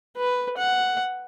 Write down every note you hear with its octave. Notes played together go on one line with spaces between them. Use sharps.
B4
F#5